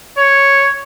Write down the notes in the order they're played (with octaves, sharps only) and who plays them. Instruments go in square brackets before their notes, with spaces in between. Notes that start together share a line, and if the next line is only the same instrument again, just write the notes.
[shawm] C#5